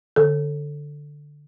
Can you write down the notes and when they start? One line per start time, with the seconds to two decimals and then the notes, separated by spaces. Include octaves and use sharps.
0.16 D3 A4